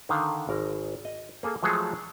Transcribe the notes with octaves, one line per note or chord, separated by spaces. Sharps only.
D3 D#3 F5
G#1 A#4
D#5
A#3 G#4 A4
F3 F#3 G#3 A3 G#4 A4